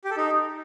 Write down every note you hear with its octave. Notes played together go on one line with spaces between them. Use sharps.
G4
A4
D#4